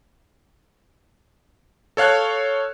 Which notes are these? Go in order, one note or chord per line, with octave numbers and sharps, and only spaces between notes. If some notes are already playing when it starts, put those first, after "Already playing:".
A4 C#5 F5 F#6 G#6